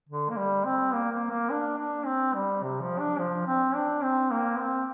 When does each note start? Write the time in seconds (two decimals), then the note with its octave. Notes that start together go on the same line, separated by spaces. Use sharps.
0.09 D3
0.30 A#3
0.37 G3
0.65 C4
0.93 A#3
1.12 A#3
1.30 A#3
1.50 D4
1.78 D4
2.05 C4
2.35 G3
2.63 C3
2.81 F3
2.99 D4
3.18 F3
3.47 C4
3.75 D4
4.03 C4
4.31 A#3
4.59 C4